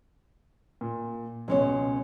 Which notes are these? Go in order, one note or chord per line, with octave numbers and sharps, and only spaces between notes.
A#2
C#2 B2 G#3 C#4 C#5